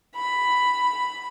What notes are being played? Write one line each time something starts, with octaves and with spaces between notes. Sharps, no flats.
B5